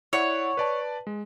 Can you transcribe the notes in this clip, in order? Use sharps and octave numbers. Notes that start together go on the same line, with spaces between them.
E4 C#5 D5 F#5
B4 D5 A5
G#3